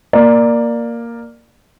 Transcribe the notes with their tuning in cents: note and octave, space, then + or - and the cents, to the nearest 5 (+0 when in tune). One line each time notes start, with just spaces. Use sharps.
A#3 +0 D5 +10